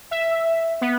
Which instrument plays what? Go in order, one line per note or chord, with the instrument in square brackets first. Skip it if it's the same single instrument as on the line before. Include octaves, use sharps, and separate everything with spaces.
[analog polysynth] E5
B3